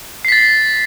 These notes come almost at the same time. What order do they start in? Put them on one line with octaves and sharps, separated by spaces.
C7 B6 A6